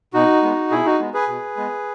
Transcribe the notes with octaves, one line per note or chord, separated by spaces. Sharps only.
B2 D#4 F#4
G#3 B3
B2 E4 G#4
D#4 F#4
G#3 B3
G#4 B4
B2
G#3 B3